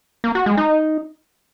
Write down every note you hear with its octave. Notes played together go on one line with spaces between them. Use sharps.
A#3
F#4
G#3
D#4